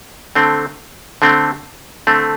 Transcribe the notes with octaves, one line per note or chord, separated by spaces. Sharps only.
D3 A3 C4
D3 A3 C4
D3 A3 C4